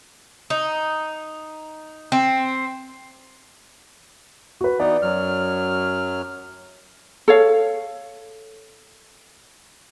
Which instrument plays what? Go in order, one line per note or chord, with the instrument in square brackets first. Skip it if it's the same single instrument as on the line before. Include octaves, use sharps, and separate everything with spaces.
[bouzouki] D#4
C4
[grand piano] F#4 B4
[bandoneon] E3 B3 D#4 [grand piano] D5
[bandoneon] F#2 F#3 F6
[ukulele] A4 C#5 F5